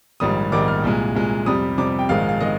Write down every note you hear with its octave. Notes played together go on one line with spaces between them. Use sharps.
A#1 G#2 D#3 G3 D#6
A#1 G#2 D#3 G3 D6
F6
C2 A#2 G#3
C2 A#2 G#3
F2 C3 G3 D#6
F2 C3 G3 D6
G5
A#1 G#2 D#3 G#3 F5
F5
D#3 G#3 D#5